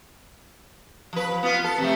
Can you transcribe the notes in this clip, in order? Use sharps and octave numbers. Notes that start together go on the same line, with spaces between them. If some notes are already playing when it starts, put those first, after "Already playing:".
F3 B4
B3 F4
A4
C3 F3 A3